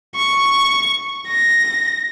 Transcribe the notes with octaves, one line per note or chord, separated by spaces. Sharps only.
C#6
A#6